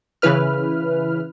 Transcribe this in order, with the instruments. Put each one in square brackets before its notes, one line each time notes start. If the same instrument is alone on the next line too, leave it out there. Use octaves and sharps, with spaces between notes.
[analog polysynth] C#3 E3 E4 B4 F6